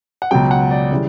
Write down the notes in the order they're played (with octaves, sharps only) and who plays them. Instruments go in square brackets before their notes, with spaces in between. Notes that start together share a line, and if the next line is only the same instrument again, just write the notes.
[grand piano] F#5
C#2 B2 F#3 G5
F#5
D5
C#3 E3 G3 D5